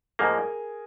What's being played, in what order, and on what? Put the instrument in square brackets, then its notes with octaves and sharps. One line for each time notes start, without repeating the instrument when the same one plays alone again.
[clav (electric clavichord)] G#2 F3 A#3 [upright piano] G#4 A#4